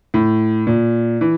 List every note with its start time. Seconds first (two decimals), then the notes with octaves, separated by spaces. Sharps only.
0.14 A2
0.67 A#2
1.21 E3